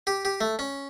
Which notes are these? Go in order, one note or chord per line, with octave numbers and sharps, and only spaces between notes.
G4
G4
A3
C#4